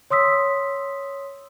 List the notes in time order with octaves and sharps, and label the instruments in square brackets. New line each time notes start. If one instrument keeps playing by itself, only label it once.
[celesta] C#5 C6 D#6 E6 B6